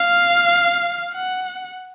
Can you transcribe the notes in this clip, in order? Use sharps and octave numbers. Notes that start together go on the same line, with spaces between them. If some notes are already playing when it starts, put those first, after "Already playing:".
Already playing: F5
F#5